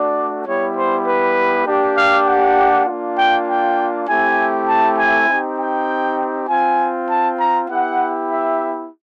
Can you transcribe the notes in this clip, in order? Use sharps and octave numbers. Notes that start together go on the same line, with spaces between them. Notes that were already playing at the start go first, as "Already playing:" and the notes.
Already playing: A3 D4 F#4 D5
G3 B3 E4 G4 C#5
C5
B4
A#3 D4 G4
F5
F#5
A#3 D4 F4
G5
G5
A3 C4 E4 G4 G#5
A5
G#5
C4 D#4 G4
G5
C4 F4 G#5
A5
A#5
B3 E4 G4 F#5
E5